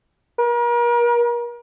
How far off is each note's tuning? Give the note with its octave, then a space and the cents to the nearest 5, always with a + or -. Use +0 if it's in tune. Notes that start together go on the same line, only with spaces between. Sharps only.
A#4 +40